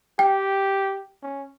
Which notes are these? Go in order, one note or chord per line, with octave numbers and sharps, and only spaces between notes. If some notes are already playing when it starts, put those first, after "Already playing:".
G4 G5
C#4